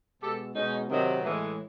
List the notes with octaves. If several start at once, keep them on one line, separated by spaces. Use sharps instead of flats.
B2 G#3 G4 A4
B2 G#3 C#4 D#4
C3 D#3 F#3
A2 E3 G#3